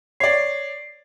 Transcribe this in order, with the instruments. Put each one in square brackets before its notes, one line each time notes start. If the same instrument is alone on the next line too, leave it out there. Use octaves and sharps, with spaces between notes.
[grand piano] C#5 D5 [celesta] C7